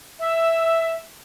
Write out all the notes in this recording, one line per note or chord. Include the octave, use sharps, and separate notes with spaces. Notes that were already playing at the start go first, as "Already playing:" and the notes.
E5